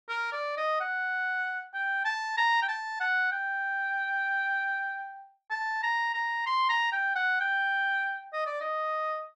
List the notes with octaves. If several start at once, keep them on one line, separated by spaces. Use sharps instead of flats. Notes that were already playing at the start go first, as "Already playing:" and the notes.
A#4
D5
D#5
F#5
G5
A5
A#5
G5
A5
F#5
G5
A5
A#5
A#5
C6
A#5
G5
F#5
G5
D#5
D5
D#5